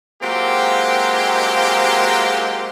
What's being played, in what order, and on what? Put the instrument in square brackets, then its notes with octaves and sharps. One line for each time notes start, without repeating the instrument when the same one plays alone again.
[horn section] F#3 G#3 A#3 C4 F4 G4